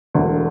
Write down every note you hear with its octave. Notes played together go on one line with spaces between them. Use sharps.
E1 D2 D3